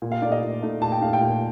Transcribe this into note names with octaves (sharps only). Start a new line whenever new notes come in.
A#2
F5
A3 D#4 D5
D#5
A#2
A3 D#4
A#2 A5
G5
A3 D#4 F5
G5
A#2